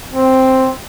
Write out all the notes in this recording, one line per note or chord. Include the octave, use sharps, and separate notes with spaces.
C4